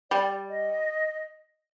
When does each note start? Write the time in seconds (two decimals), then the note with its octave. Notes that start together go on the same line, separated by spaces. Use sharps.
0.11 G3 D5
0.49 D#5